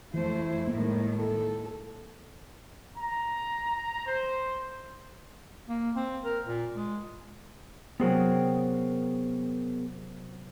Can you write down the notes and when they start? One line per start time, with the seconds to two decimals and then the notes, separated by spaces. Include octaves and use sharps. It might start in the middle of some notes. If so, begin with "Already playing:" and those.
0.14 F2 E3 A3 E4 C5
0.67 A2 D#3 G#3 A#3
1.14 A4
2.97 A#5
4.05 C5
5.68 A#3
5.96 C4
6.25 A#4
6.47 A#2
6.76 G#3
8.00 C3 F#3 B3 C#4 G#4 A#4